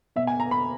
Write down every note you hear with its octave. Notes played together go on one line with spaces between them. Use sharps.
B2 E5
G#5
A#5
B5